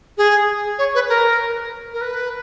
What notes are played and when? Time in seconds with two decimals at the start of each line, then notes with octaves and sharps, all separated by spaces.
0.18 G#4
0.78 C#5
0.95 B4
1.09 A#4
1.93 A#4
2.01 B4